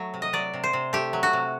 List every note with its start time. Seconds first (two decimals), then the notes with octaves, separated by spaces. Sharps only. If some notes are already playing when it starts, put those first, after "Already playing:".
Already playing: F#3 A3
0.14 C3
0.22 D#5
0.33 F#3 D5
0.54 C3
0.64 C5
0.73 C3
0.93 A3 G4
1.13 F#3
1.23 F#4
1.33 C3